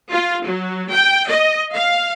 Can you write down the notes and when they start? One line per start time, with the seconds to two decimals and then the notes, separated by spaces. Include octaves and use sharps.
0.11 F4
0.45 F#3
0.91 G5
1.28 D#5
1.74 F5